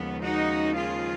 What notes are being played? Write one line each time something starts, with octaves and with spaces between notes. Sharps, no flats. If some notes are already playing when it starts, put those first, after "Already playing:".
Already playing: D#2 C#3 F3 G#3 B3
D#4 F#4
F4 G#4